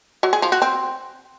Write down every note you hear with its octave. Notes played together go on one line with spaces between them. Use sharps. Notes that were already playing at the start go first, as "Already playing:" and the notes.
F#3
G#4
F3
F#4
C4